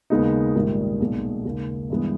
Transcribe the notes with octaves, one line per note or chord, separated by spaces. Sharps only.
D#2 C#3 G#3 B3 D#4
A#1 G#2 D#3 G3
B1 A#2 G#3
D#2 C#3 G#3
G2 E3 G#3 B3